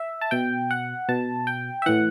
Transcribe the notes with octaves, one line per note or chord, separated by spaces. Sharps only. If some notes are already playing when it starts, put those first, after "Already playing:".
Already playing: E5
A5
B2 G5
F#5
B2 A5
G5
E5
A2 E3 F#5